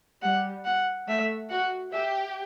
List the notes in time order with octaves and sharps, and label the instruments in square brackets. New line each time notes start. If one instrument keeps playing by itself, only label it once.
[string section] G3 [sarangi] F#5
[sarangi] F#5
[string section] A3 [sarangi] E5
[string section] F#4 [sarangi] F#5
[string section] G4 [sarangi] E5